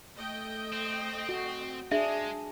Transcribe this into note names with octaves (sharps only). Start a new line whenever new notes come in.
A3 D#5 G5
C4
F#4
G#3 D4 G#4 E5